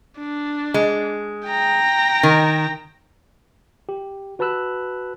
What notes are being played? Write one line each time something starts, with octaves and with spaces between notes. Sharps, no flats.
D4
G#3
G5 A#5
D#3
G4
F#4 B4 A5 B5 E6 F#6